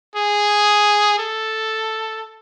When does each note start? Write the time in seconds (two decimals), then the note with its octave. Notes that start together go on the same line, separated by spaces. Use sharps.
0.16 G#4
1.18 A4